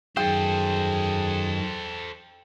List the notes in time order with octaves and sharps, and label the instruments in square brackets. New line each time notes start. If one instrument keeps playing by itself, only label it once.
[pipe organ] F#2 D#3 [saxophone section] G#4 [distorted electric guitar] A4 C5 [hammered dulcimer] G5